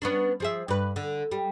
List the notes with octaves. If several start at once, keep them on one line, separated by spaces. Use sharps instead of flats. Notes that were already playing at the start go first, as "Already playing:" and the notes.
B3 C#4 D4
F3 G#4 E5
G2 B4
D3
G3